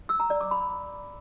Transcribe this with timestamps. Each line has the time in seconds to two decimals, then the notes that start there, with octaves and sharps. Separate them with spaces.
0.09 E6
0.20 A#5
0.30 D5
0.41 D6
0.51 B5